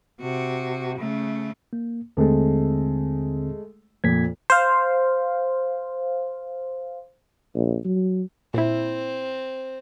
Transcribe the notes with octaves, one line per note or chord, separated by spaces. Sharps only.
C3 F#4
C#3 A3
A#3
D#2 D3 G#3 A3 C4 A4
F2 A#2 G#6 B6
C5 F5
A#1
F#3
A#2 C4 E4